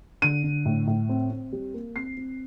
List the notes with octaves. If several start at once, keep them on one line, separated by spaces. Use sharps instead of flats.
D3 D#7
D3
A2
A2
C4
C4
G3
A#3
C4 C7
C4